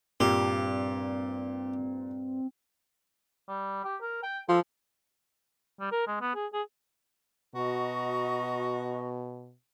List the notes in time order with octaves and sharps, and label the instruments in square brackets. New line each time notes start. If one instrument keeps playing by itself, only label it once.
[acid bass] G2 [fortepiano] A#2 [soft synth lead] C4 [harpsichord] G4
[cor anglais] G3
G4
A#4
G5
[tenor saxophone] F3 [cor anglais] A4
[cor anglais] G3
A#4
G#3
B3
G#4
G#4
[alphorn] B2 [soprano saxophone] F#4 [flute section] D#5 A#5 C#6